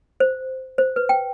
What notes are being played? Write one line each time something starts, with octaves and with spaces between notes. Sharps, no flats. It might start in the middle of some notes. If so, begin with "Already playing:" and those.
C5
C5
B4
G5